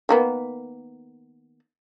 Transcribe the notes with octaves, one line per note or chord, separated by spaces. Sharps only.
D#3 A#3 B3